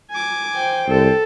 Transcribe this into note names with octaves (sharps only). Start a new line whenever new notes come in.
G#5 D6
C5 G5
C2 A4